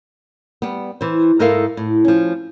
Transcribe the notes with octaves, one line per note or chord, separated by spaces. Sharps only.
G3 B3
E3 C5
G#2 D#4 E4 A4 A#4 F5
A2
F3 C#4